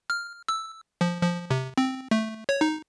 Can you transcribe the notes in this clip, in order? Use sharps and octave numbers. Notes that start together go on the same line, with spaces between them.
F6
E6
F3
F3
C3
C4
A3
C#5
D#4